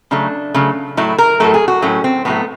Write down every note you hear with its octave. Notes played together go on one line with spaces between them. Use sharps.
C#3 F#3 A3 D4
C#3 F#3 A3
A2 F#3 A3 E4
A#4
A2 F#3 A3 A4
G#4
F#4
A2 F#3 A3 C#4
C4
A2 F#3 A3 B3